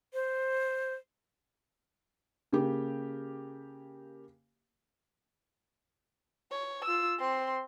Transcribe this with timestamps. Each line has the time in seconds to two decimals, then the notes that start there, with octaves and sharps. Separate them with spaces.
0.14 C5
2.53 C#3 A#3 G4
6.51 C#5
6.84 F4 E6
7.19 C4 C6